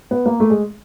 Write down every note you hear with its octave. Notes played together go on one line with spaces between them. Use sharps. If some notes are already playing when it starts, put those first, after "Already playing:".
B3
A#3
A3
G#3